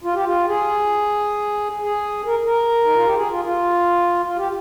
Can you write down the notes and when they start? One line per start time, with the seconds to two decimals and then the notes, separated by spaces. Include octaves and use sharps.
0.04 F4
0.14 G4
0.24 F4
0.48 G#4
1.82 G#4
2.26 A#4
2.45 A#4
2.85 D#4
2.95 F4
3.05 G4
3.14 G#4
3.30 F4
3.45 F4
4.25 F4
4.37 G4